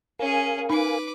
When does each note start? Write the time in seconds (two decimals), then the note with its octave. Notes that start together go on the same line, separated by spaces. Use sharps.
0.19 C#4 G#4 A#4 F5 G#5
0.70 D#4 B4 D6